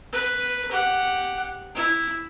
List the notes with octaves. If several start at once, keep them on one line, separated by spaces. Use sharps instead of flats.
B4
G4 F#5
E4